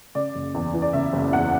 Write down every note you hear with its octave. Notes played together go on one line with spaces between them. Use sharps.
C#3 D5
F#1
E2
E3
D5
C#3 E5
F#1
E2 F#5